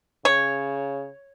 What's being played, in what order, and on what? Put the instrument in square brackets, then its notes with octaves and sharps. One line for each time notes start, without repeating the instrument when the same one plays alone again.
[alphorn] C#3 [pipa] C#5